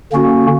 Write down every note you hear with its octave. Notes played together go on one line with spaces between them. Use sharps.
D3 A#3 C#4 F#4